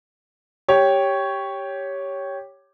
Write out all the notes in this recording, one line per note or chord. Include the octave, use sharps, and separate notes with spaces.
G4 C#5